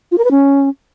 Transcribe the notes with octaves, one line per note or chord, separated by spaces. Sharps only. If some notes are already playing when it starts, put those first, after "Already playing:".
F4
A#4
B4
C#4